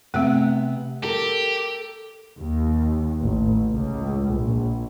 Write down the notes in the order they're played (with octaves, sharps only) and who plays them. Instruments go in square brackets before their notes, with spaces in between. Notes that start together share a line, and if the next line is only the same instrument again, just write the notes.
[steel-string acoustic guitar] C3 B3 [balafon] A3 C4
[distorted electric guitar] G4 [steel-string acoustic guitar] A4 A#4
[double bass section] D#2
A1
C#2
A#1